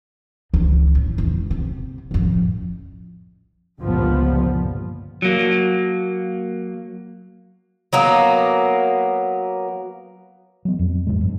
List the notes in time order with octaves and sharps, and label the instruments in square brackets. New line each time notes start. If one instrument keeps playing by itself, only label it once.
[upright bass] C#2 E3
A1
E1
C3
A1 F2
[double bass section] G1 C#2 G2 A#2 F3 B3
[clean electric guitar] F#3 A#3
[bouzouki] F#3 A#3 B3
[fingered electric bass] F#3 B3
F2
A1 F2 C3 G#3
G2